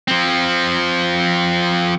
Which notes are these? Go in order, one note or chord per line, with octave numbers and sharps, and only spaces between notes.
F3 C4